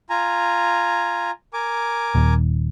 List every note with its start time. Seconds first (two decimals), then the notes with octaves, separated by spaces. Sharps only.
0.10 F4 G#5 A#5
1.53 A#4 G#5 D6
2.15 D#1 D#2